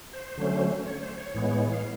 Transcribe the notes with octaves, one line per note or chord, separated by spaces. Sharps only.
C5
D3 F#3 A3 C#4
C#5
C5
C#5
A2 E3 G#3 B3
F5